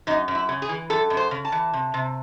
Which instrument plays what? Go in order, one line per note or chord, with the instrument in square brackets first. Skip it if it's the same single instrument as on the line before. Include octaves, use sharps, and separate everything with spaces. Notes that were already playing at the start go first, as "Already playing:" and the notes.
[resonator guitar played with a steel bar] F#2 D#4
F#2
E4
C#3
G#4
E3
F#2 A4
F#2
C5
C#3
A5
E3
C3
C3